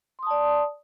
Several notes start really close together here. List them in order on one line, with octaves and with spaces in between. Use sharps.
C6 D#6 A5 D5